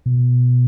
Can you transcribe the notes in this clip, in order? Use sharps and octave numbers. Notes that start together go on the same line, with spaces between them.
B2